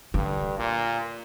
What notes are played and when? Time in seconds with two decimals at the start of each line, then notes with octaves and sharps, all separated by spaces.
0.14 G2 D3
0.59 A#2